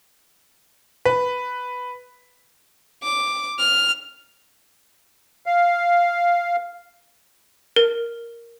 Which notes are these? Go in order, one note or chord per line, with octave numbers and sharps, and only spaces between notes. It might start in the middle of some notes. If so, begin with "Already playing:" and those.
B4
D6
F6
F5
A#4